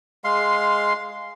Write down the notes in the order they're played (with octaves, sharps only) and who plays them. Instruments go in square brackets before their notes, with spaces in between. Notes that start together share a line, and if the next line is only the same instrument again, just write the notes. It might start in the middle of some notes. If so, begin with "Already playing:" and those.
[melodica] G#3 F5 C6